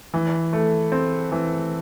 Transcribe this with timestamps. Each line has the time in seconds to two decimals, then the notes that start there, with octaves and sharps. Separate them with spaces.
0.14 E3
0.53 A3
0.92 C4
1.32 E3